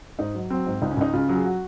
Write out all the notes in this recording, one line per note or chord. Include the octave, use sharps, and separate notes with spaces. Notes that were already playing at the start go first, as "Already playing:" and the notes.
G#2 D#4
F#3
F#3 C4
G#2
C#2 D#4
C#4
C#2 D#4
C#3 F4
F#3
G#4
F#4